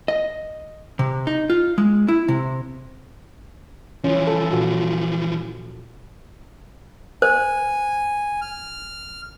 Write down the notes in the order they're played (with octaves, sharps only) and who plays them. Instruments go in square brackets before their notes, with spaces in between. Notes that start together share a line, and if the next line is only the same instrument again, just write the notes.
[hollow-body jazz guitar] D#5
C3
D#4
F4
G#3
E4
C3
[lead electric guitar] E3 F3 [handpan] C#4
[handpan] A4
A#2 F4 F#4
[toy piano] C5 [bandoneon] G#5
[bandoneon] F6